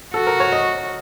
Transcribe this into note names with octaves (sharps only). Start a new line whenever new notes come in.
F#4 A4
A#4
C#5
D#5